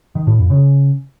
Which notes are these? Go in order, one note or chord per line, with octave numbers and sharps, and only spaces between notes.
D#3
A2
F2
C#3